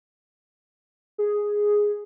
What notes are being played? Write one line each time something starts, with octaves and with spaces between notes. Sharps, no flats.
G#4